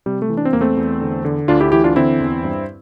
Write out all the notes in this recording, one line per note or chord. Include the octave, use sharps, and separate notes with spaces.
C3 G3
A3
E3
D4
C4
E2 A#3
A3 C4
E2
D3
D3
D2 D4 F4
E4 G4
E3 E4 G4
D4 F4
D3 C4 E4
E2
G2